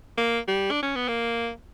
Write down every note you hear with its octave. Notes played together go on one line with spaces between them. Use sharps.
A#3
G3
D4
C#4
B3
A#3